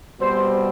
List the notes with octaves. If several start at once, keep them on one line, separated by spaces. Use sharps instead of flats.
B2 G3 C4 C5